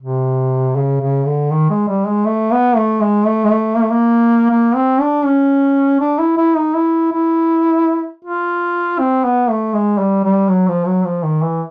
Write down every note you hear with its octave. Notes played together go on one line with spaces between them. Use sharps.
C3
C#3
C#3
D3
D#3
G#3
G3
G#3
A3
B3
A3
G#3
A3
G#3
A3
A#3
A3
A#3
A#3
C4
D4
C#4
D4
E4
E4
D#4
E4
E4
F4
C4
B3
A3
G#3
G3
G3
F#3
F3
F#3
F3
D#3
E3